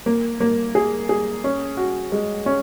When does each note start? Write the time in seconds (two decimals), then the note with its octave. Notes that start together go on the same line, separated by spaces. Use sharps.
0.06 A#3
0.40 A#3
0.75 G#4
1.09 G#4
1.44 C#4
1.77 F#4
2.12 G#3
2.46 C#4